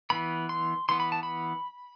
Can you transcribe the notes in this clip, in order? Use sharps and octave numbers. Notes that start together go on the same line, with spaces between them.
E3 B3 B5
C6
E3 B3 C6
B5
A5
B5